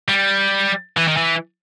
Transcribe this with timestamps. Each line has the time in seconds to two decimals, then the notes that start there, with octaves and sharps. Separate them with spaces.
0.09 G3
0.97 E3
1.08 D#3
1.17 E3